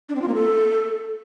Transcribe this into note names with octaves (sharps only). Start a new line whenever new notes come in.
D4
C4
F4
A#3
A4